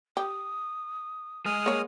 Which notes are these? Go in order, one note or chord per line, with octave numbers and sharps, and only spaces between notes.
G4 D#6
G#3 G#4 D#6 F6
A#3 C#5 F#5